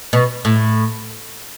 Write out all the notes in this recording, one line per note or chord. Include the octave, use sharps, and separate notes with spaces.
B2
A2